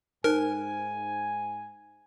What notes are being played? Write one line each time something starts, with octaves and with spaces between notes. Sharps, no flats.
G#2 D#4 A#4 C5 G#5